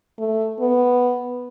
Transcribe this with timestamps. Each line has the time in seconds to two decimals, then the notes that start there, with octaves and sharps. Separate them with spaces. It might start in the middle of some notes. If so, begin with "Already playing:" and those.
0.19 A3
0.60 B3